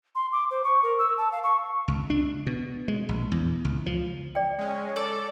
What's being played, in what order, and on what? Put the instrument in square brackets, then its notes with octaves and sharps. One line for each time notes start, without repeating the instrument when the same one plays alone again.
[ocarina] C6
D6
C5
C#6
A#4
E6
A5
F5
C#6
[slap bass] C#2
D4
B2
G#3
A#1
E2
C#2
F3
[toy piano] D5 G5
[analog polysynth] G#3 C#4
[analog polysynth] A4 [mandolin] D5